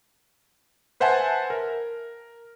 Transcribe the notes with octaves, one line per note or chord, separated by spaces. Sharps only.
B4 C5 E5 F#5 G#5 A5
A#4